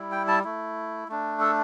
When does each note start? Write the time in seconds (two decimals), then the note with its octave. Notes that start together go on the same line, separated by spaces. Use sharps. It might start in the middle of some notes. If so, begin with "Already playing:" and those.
Already playing: G3 E4
0.12 G5
0.28 A5
0.44 A3 E4
1.08 A3 D4
1.40 A4